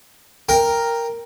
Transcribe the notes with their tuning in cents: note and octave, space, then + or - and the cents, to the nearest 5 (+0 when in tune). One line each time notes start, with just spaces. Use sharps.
A#4 +0 G5 +15